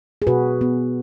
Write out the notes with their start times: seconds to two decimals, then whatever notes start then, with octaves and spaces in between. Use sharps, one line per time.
0.22 G#4
0.27 B2 F#4 B4
0.61 B3